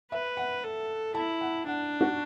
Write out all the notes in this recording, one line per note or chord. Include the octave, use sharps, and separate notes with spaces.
B4 E5
F#5
A4
E4 A5
F#5
D4 F#5
F#4